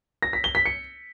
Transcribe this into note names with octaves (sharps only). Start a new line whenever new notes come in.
A#6
B6
G7
B6
C#7